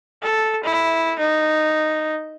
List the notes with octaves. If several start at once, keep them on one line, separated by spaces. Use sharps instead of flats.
A4
E4
D#4